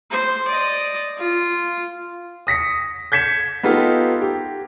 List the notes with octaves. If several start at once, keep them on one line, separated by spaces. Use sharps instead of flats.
C5
D5 D#5
F4
D#6 A#6 B6 C#7
G6 G#6 B6 C#7 E7
B3 D#4 F4 G4 A4
G4